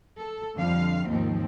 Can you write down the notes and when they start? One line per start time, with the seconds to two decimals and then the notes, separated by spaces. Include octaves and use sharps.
0.19 A4
0.56 F2 D3 F3 G3 F5
1.08 D#2 G#2 D#3 F3 C4